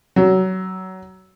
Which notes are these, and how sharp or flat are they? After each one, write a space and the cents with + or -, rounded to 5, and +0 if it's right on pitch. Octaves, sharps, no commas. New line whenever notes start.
F#3 +20